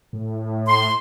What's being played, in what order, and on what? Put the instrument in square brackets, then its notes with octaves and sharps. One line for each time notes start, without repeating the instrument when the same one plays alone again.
[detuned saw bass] A2
[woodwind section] C6